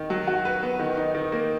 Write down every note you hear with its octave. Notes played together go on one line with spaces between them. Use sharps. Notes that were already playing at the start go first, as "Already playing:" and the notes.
Already playing: D#3
F#3
F#4
B4
B3
D#3
D#4
D#3
A#3